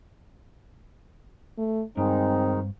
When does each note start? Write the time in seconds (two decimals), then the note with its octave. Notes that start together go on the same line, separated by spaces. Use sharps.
1.58 A3
1.97 G2 D#3 G#3 C4 D#4